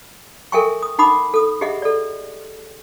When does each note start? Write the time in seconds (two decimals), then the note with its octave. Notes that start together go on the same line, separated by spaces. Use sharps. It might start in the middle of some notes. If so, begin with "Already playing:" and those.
0.52 A4 A#4 E5 G5 G#5 C#6
0.83 D#6
0.99 D#4 F#5 B5 D6 D#6
1.34 A4 D#6
1.61 G4 G#4 D#5 E5 F#5
1.82 A4 D5